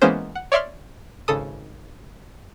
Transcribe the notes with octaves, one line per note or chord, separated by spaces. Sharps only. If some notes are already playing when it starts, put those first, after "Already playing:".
E3 G#3 A#3 B3 C#4 C5
F#5
C#5 D5 E5 C6 F6
G#1 C#3 A4 D#6